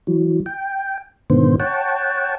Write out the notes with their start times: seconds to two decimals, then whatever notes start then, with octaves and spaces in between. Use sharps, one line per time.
0.07 E3 F#3
0.46 G5
1.30 G#2 B2 D3 D#3 B3 C5
1.60 C#5 F#5 G5 A5